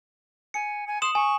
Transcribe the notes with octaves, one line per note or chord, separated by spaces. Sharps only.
G#5 C#7
G#5
C6 D#6 E7 F#7
G#5 C#6